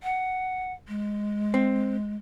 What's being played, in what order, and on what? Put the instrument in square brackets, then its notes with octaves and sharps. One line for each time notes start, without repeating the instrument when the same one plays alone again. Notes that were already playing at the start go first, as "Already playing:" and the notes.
[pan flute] F#5
G#3
[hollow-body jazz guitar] C4